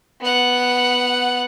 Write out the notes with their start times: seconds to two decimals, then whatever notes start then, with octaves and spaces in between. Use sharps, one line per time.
0.21 B3 F#5